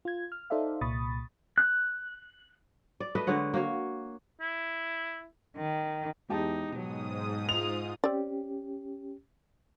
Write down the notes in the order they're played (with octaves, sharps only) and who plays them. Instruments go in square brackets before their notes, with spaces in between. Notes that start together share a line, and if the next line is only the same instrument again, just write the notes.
[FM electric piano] F4 G#6
F6
D#4 A4 C5 D5 E5 F5
C2 A#2 B5 C#6 D#6 A6
[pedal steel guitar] F#6
[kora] D5
A3 B4 D#5
D3 G#3 C#5 F#5
A#3 F#4 C#5
[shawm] E4
[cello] D#3
[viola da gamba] E2 D#4 [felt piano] G#3 G4 A5
[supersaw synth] G#2 D#6 [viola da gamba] B2 F#3
[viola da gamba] F4 [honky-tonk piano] F7
[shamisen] C4 D5 [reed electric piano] C#4 G4